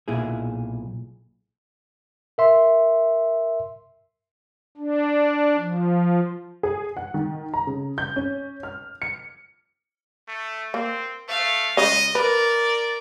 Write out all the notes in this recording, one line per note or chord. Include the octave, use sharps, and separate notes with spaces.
B1 A#2 E4 G#4
A#4 E5 C6
D4
F3
G#4
F#5
D#3
A#5
C#3
G6
C#4
F6
C#7
A3
A#3 C4
A3 F5
C#3 G#3 D#5
A#4 B4 D5